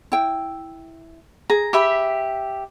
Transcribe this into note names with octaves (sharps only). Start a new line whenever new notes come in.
E4 G5
G#4 A#5
G4 E5 B5